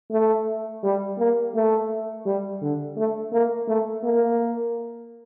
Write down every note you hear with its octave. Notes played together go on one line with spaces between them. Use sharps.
A3
G3
A#3
A3
G3
D3
A3
A#3
A3
A#3